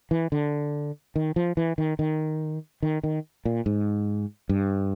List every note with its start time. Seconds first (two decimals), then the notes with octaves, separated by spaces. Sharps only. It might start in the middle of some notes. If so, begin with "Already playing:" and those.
0.11 E3
0.32 D3
1.16 D#3
1.36 F3
1.57 E3
1.78 D#3
1.99 D#3
2.82 D#3
3.04 D#3
3.45 A#2
3.66 G#2
4.49 G2